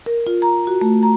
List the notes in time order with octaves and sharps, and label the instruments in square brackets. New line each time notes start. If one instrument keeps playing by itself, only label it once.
[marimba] A#4
F4
A#5
F#4
A3
A#5